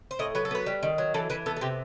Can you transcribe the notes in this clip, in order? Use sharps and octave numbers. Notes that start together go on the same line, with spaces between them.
C5
A2 D#5
F#3 B4
A4
B3 B4
G3
D#3
F#3
E3 A4
E3 B4
B3 A4
A4
C3 G4